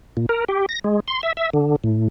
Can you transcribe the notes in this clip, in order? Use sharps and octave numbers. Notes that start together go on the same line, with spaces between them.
A#2
A#4
G4
A#6
G#3
C6
E5
E5
D3
A2